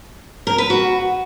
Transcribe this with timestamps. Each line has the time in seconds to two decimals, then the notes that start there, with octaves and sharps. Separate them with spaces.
0.47 A#4
0.58 B4
0.70 F#4